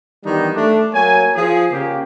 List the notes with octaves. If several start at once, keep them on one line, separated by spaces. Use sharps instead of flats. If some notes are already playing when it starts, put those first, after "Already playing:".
D#3 E3 G3 B3 D4 D#4
A3 D4
F#3 A#3 C#5 G#5
F3 G#4
C#3 A#3 G4